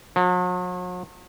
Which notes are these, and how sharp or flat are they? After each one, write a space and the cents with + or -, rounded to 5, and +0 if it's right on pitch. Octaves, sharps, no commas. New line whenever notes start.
F#3 -45